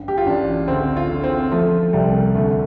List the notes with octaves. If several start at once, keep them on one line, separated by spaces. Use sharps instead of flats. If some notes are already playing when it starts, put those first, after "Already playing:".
Already playing: A1 G2
G4
F4
A1 D4
D2 C4
F4
D3
C4
F3 A3
C2 G3
D2 A3